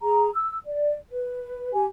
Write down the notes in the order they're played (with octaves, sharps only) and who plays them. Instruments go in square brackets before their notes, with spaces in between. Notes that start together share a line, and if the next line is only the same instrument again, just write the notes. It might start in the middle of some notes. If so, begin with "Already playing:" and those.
[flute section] G#4 A#5
E6
D5
B4
G4 G#5